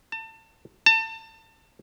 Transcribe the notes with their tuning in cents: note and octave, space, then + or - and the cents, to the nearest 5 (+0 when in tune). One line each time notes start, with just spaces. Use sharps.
A5 +30
A5 +30